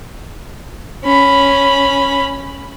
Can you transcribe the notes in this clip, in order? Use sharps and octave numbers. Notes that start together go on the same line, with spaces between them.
C#4 B5